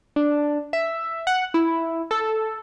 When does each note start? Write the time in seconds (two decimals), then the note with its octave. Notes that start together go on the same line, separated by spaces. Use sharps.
0.16 D4
0.73 E5
1.27 F#5
1.54 E4
2.11 A4